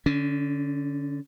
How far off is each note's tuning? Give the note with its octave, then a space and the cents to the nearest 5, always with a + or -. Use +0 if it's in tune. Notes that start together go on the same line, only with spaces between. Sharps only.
D3 -5 C#4 +25